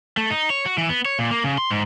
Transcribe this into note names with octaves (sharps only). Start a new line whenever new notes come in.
A3
D#4
C#5
F#4
E3
B3
C#5
A#2
A#3
C#3
C6
G#2